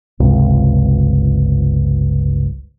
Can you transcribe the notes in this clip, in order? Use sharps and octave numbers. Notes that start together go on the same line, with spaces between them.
G1 C#2 C3